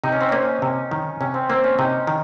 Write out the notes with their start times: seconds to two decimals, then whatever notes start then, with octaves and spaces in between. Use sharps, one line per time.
0.04 C3 D#4
0.12 C#4
0.20 C4
0.28 A#3 C#4
0.62 C3
0.91 D#3
1.20 C3 C#4
1.34 C4
1.50 A#3 C4
1.64 C#4
1.78 C3 D#4
2.07 D#3